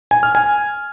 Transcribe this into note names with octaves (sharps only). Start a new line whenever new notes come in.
G#5
F6
G#5